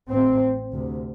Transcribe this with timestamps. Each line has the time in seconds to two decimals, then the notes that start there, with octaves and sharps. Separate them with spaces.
0.10 A1 A2 C4
0.73 D2 C3